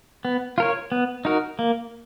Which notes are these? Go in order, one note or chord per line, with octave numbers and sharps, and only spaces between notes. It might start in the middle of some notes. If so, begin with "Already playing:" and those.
B3
F4 A#4 C#5
B3
D#4 F#4 A#4
A#3